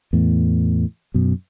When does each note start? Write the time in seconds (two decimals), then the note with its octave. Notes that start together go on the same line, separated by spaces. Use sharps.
0.13 E2 A2
1.14 F#2 B2